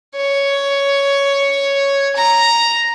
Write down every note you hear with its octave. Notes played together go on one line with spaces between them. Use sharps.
C#5
A#5